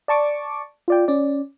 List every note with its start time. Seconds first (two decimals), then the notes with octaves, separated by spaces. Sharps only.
0.08 D5 A5 C#6 D6
0.88 F4 D5 G5
1.08 C#4 D5